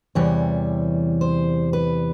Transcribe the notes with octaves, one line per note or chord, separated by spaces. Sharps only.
E2 C3 E3 G3 C#5
C5
B4